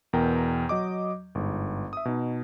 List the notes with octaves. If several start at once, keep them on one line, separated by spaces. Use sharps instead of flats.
E2 B2 A#4 G5 A#5 G6
F#3 D#5 D6
G1 G#2
E5 D#6
B2 D#4